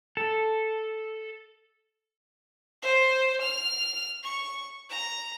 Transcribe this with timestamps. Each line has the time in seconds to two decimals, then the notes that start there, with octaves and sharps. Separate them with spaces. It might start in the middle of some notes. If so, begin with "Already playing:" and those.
0.17 A4
2.82 C5
3.41 F6
4.23 C#6
4.89 A#5